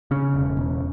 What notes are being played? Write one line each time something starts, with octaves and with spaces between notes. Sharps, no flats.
C#3 C#4
E1
E1